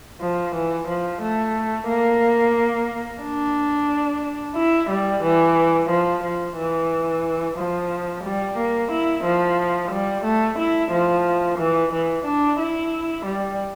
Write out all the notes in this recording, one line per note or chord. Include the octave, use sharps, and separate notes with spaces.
F3
E3
F3
A3
A#3
D4
E4
G3
E3
F3
F3
E3
F3
G3
A#3
E4
F3
G3
A3
E4
F3
E3
E3
D4
E4
G3